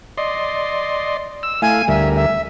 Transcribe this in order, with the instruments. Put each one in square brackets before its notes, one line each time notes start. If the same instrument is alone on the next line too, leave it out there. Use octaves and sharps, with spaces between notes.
[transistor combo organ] D5 D#5 C6
E6
[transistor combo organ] A3 E4 F5 [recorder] G#5
[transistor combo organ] D2 G3 A#4 [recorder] E5
[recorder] E5